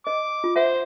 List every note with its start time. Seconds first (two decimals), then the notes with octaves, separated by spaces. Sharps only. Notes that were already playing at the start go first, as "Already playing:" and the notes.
0.07 D#5 D6
0.44 F4
0.56 C5 E5 F#5